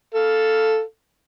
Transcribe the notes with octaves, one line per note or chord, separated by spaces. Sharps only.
A4 F5